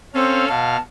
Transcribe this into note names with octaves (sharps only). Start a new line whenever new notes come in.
C4 C#4 A4 F5
B2 F5 A5